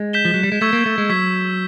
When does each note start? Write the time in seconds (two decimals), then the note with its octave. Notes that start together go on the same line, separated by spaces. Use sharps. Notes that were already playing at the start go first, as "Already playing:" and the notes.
Already playing: G#3
0.13 G6 B6 E7 G7
0.25 F3
0.34 F#3
0.43 G3
0.52 G#3
0.61 A3 C#6 E6 G#6 B6
0.73 A#3
0.86 A3
0.98 G#3
1.10 F#3 C#6 E6 G#6 B6